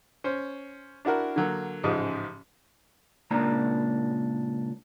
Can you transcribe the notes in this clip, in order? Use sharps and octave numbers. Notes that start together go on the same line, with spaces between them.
C#4 C5
D4 E4 F#4 A#4
D3 F#3 A#3
A1 G#2 C#3 F3 G#3
C#2 A#2 D4 A#5